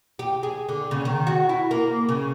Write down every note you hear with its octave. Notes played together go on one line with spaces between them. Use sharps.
G4
G#4
D3
C#3
D#3
F#4
E4
A#3
C#3